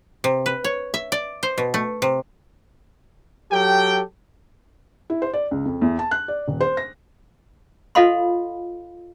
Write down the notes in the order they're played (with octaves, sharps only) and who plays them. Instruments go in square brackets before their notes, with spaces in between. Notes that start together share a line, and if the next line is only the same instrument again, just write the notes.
[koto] C3
B4
C#5
E5
D5
C5
B2
A3
C3
[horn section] F#3 G4 A4 G5
[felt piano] E4
C5
D5
C#2
F2
E2
A5
F#6
D5
D#1
C5
A#6
[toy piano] F4 A4 D#5 F5 B5 C6